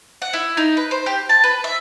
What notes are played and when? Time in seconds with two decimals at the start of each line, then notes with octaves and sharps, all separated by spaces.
0.22 F#5
0.33 E4
0.57 D#4
0.77 B4
0.91 C5
1.06 G4
1.29 A5
1.44 B4
1.64 E5